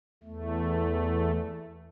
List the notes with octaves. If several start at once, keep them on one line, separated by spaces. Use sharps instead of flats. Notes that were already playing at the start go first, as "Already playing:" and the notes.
E2 A3